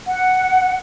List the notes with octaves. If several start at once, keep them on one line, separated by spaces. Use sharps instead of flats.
F#5